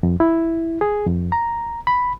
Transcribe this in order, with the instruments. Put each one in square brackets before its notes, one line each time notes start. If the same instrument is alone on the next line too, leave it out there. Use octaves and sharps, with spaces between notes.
[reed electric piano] F2
E4
G#4
F2
A#5
B5